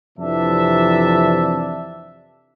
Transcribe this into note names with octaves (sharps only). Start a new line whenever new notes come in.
F2 C3 E3 D4 E5 A5